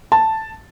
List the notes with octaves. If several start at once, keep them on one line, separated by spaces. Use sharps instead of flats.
A5